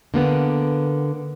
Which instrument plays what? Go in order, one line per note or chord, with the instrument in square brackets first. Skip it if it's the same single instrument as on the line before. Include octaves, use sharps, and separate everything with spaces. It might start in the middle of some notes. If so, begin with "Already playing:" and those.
[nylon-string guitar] D3 A#3 B3